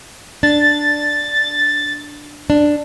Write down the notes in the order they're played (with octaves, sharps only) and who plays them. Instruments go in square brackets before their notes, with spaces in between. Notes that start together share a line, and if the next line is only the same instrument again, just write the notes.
[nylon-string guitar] D4 [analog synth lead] A6
[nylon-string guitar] D4